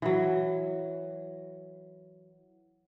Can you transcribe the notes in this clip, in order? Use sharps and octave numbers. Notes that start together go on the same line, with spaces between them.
E3 F#3